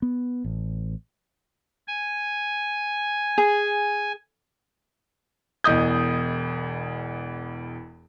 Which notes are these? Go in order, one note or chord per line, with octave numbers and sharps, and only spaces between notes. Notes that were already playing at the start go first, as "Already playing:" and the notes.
B3
A1
G#5
G#4
E1 E2 D#5 D#6 G6